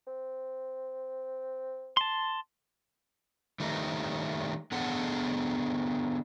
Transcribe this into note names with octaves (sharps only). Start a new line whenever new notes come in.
C4
A5 C6
D#3 G3 A3 D#4
D3 B3 G#4 A4 F#5